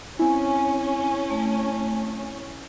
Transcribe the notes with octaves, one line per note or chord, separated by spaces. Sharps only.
C4 C#4 E4 G#5
A3